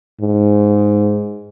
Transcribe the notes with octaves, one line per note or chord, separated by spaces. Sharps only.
G#2